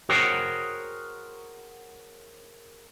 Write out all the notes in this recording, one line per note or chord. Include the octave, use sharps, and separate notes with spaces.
F#4 G#4 A#4 C5 C#5 G5